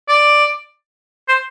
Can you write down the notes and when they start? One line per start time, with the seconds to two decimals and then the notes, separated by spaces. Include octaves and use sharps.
0.09 D5
1.28 C5